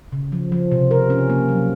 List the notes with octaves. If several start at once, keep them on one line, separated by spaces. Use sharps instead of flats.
C#3
F3
F3
C3
A#4
C#4
A#3
F#3